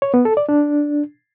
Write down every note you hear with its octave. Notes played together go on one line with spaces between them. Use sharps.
C#5
B3
A4
D5
D4